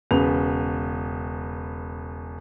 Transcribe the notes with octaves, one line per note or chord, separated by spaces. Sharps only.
E1 C#3 B4 F7